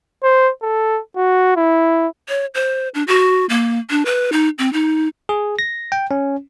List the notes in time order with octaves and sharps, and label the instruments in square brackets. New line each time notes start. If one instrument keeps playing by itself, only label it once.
[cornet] C5
A4
F#4
E4
[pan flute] C#5
C5
D4
F#4
A#3
D4
B4
D#4
C4
D#4
[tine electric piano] G#4
A#6
G5
C#4